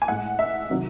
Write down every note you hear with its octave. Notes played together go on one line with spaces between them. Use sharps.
G#5
A2 G#3 F#5
E5
C3 D#3 F#3